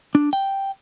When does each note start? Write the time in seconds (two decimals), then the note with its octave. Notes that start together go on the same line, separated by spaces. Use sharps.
0.15 D4
0.33 G5